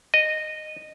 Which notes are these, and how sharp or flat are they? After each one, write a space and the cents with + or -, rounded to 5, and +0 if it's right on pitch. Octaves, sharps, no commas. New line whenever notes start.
D#5 -15